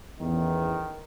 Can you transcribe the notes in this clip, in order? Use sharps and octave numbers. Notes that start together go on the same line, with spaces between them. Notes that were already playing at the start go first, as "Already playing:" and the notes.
A1 E2 D#3